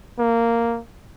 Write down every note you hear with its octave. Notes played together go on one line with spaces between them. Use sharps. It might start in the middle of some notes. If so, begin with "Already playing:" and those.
A#3